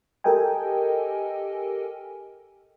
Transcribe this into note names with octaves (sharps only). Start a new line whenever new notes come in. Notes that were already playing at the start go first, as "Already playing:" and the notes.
G4 A4 A#4 D#5 G5 G#5